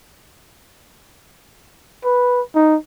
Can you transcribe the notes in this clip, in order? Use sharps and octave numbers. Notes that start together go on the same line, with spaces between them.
B4
D#4